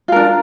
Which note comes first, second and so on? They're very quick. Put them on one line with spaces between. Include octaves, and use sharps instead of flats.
F4 A#4 D4